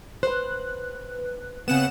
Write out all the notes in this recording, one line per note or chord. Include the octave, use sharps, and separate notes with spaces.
B4 C5 F#6
C#3 B3 C4 F#5 E7